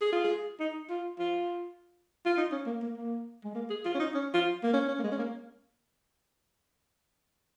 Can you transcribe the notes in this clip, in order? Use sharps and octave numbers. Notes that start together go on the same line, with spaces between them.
G#4
F4
G#4
D#4
F4
F4
F4
D#4
C#4
A#3
A#3
A#3
G#3
A#3
G#4
F4
C#4
D#4
C#4
F4
A#3
C#4
C#4
A#3
G#3
C#4
A#3